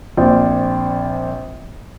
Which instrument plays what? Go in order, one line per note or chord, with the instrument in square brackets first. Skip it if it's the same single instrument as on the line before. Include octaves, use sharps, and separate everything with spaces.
[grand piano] A#1 C4 F4 D5 G5